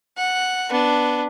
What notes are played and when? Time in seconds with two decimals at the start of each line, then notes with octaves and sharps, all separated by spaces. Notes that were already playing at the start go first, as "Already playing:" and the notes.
0.17 F#5
0.70 B3 D4